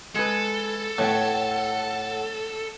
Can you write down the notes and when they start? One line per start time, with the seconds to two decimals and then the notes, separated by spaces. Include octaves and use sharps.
0.15 G#3 A4 B4
0.98 A2 B4 C#5 F#5 G5